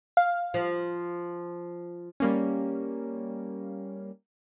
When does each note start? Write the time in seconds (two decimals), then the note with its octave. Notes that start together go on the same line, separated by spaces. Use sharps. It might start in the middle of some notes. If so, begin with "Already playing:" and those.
0.17 F5
0.54 F3
2.20 G3 A#3 C#4